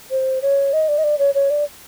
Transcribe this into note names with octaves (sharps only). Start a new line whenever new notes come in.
C5
C#5
D#5
D5
D#5
D5
C#5
C#5
D5